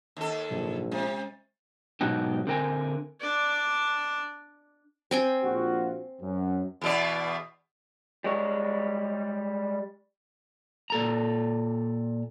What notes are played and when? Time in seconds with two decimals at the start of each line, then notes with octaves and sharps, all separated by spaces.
0.17 D#2 A4
0.51 A#1 G#2 C3 F#3
0.92 C3 G#3 C#4
2.01 G#2 B2 F#3 D#4 F#4 G4
2.47 D3 C4 A#4 G5 G#5
3.21 D4 D5
5.11 C4 G5 G#5
5.43 A#1 F4 F#4
6.20 F#2
6.81 E2 B2 D5
8.24 G3 G#3 C#5
10.90 A#2 A4 A#5